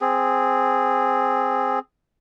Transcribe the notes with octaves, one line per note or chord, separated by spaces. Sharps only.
C4 G#4